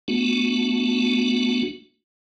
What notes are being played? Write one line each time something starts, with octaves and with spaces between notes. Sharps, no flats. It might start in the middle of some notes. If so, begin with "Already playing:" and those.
A3 B3 D4 F#4